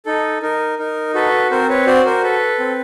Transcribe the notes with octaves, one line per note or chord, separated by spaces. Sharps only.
D#4 A4
D#4 A#4
D#4 A#4
F#4 A4 B4
C4 A#4 C5
B4 C#5
F#4 C5 D5
A#4 C5
A4 B4
C4